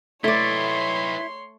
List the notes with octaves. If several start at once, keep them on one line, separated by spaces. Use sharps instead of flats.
A3 D#4 E4 B4 C#5 D5 C6